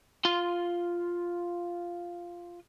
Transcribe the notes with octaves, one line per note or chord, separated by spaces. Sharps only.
F4 C6